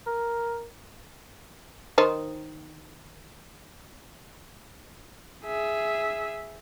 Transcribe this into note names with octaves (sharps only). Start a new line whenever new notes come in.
A#4
D#3 D#4 C5
G#4 E5